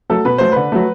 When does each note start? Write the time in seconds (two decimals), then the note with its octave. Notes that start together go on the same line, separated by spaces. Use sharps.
0.10 F#3 A3 A4
0.25 B2 B4
0.38 F#3 A3 C5
0.52 D3 B4
0.72 F#3 A3